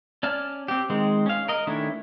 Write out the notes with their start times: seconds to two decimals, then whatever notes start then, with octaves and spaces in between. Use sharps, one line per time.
0.23 C#4 D5 A5 F6
0.68 C4 G4
0.90 D#3 G#3 C4
1.26 C#4 F5
1.48 A#4 D#5
1.67 D#3 A3 C#4 D4 E4